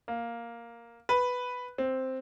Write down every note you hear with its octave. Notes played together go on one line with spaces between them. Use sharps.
A#3
B4
C4